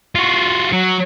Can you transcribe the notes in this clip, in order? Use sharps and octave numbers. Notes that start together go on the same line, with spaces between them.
F4 F#4
F#3